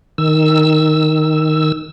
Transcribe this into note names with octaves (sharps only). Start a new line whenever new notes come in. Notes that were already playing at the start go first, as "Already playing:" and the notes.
D#3 E6